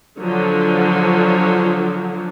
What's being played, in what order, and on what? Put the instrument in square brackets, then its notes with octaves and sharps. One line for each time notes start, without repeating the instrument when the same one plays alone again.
[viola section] D3 F3 F#3